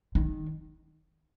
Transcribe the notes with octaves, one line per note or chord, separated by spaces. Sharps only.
D#3